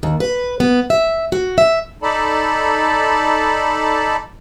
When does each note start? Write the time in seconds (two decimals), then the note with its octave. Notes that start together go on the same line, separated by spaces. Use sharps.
0.03 D#2
0.20 B4
0.60 B3
0.90 E5
1.32 F#4
1.58 E5
2.02 D#4 A4 D5 A5 B5